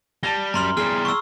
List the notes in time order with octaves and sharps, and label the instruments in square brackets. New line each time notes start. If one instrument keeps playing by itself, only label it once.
[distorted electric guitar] G3 [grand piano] A5 A6 A#6 [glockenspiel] G7
[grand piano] F#2 F7 [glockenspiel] A#5 C6 F6
[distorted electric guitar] E2 G3 [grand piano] G#4 [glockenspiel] F6 C7
[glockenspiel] C#6 E6